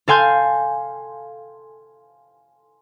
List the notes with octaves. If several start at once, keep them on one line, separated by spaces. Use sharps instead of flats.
A4 F5 G#5 C6 G6